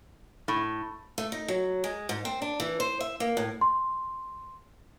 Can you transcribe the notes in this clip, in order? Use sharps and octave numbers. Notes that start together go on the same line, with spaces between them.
A2
A3
D#4
F#3
G#3
G#2
C4
D4
E3
C5
E5
A#3
A2
C6